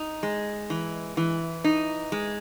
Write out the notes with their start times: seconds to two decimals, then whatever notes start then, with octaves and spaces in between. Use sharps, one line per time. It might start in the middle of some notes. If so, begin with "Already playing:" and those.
Already playing: D#4
0.23 G#3
0.70 E3
1.17 E3
1.64 D#4
2.12 G#3